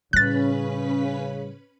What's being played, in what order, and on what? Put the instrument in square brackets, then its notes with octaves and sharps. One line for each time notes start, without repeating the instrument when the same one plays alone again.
[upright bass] A2 G3 [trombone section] C#3 [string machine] C#4 B4 B5 [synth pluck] F#6 A6